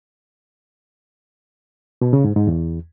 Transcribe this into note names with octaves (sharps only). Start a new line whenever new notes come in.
B2
C#3
G#2
G#2
E2